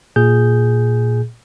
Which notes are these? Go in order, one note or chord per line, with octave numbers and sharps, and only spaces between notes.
A#2 G#4 G6